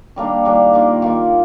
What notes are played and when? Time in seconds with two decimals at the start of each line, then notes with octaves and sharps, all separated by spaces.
0.16 D#3 G3 A#3 D4
0.45 D#3 G3 A#3 D4
0.73 D#3 A#3 F4
1.02 D#3 A#3 F4